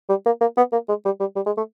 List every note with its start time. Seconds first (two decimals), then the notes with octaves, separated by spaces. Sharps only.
0.09 G3
0.26 A#3
0.41 A#3
0.57 B3
0.72 A#3
0.89 G#3
1.05 G3
1.20 G3
1.36 G3
1.46 G#3
1.57 A3